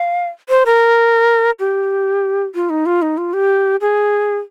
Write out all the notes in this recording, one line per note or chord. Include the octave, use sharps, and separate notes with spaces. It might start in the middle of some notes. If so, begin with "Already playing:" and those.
Already playing: F5
C5
A#4
G4
F4
D#4
F4
D#4
F4
G4
G#4